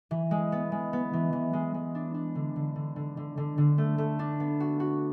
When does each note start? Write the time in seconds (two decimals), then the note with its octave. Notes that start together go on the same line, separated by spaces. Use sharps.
0.11 E3
0.31 G#3
0.52 B3
0.72 G#3
0.93 B3
1.13 E3
1.33 E3
1.53 G#3
1.74 G#3
1.95 D4
2.14 D4
2.35 D3
2.56 D3
2.76 D3
2.96 D3
3.17 D3
3.37 D3
3.58 D3
3.78 A3
3.98 A3
4.19 D4
4.40 B3
4.60 F#4
4.80 F#4